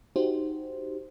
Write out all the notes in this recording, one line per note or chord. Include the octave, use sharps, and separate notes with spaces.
D#4 F#4 G4 C5